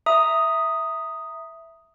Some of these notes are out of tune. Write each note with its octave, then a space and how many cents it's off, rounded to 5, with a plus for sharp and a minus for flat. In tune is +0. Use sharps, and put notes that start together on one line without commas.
E5 +0 A#5 +0 D#6 +0